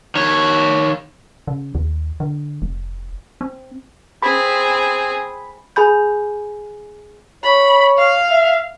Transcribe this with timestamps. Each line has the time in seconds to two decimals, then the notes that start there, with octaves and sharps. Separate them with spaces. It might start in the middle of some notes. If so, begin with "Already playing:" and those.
0.15 D#3 C#5
1.47 C#3
1.75 D#2
2.20 D3
2.62 F1
3.41 C4
4.22 C4 G#4 B5
5.76 G#4 G#5 B5 G6
7.44 C#5 B5
7.98 F5
8.30 E5